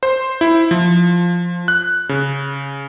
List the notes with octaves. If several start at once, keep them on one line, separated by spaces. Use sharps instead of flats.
C5
E4
F3
F#6
C#3